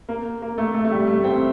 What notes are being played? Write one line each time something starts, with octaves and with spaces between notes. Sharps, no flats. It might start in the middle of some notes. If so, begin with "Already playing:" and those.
A#3
A#3
A3
A3
A3
G3
A3
C4